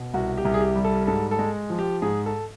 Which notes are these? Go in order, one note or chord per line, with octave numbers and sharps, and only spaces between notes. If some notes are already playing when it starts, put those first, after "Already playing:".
Already playing: B2
C2 F#4
G4
C2
G#4
G4
G3
A4
G#2 A4
A4
G#3
F3
G4
G#2 G#4
A4